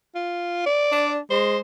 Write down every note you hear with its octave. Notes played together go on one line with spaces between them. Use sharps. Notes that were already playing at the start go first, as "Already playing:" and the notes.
F4
D5
D4
G#3 C5